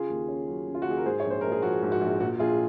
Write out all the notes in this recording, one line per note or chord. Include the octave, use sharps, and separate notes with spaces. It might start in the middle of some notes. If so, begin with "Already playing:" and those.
Already playing: C#3 F4 G#4
D#2
C#4
F#3
C#3
F4
F#4
D#2 G#4
A#4
G#2 G#4 C5
A#1 C#5
C5
A#1 A#4
G#4
F3 F#4
G#2
F#4
A#1
A#2 F#4
A#1 F4 G#4